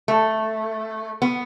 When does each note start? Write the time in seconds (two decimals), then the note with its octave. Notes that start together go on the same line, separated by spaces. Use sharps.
0.08 A3
1.22 B3